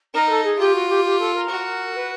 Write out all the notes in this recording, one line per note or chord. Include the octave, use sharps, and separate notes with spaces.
D#4 A#4
A4
G#4
F4 G4
F#4
G4
G4
A4
A#4
F#4
B4